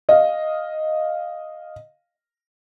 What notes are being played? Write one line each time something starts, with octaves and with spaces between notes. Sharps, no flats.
D#5 F5